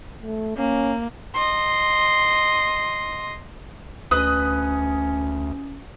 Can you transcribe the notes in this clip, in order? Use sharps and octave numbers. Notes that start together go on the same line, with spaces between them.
A3
A#3 C#4
D#5 C6
D2 C#4 B4 D#5 B5 D#6